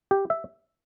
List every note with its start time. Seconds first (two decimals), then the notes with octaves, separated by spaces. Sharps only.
0.11 G4
0.30 E5